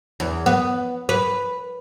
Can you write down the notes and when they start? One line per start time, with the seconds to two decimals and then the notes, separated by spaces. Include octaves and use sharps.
0.20 E2
0.46 B3
1.09 B4